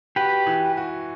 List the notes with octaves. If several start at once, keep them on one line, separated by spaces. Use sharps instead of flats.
F#4 G4 B4
E3
F#4